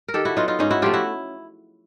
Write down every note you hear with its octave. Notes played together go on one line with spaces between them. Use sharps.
A#4
D#3 G4 A4
E4 F#4
F#3 B3 D#4 F4
D#4 F4
G#2 C#4 D#4
E4 F#4
F3 A3 F4 G4
E4 F#4